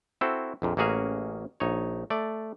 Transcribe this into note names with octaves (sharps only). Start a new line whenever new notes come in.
C4 E4 F#4 A4 C5
A#1 F2 A#2
A1 A#3 C#4 F#4 G#4 A#5
A#1 D#4 C#5
A3 D5